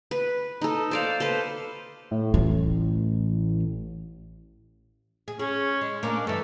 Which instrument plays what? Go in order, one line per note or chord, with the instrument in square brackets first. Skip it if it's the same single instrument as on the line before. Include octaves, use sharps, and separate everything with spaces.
[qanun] B4
D#4 A4
C5 D5 F5
A4 B4 C5
[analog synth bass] A2
[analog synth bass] A1 [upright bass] F4
[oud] G#4
[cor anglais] C#4 [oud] G#4
[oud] G#3
[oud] A#3 C#4 [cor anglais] D4
[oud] G2 E3 [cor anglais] A4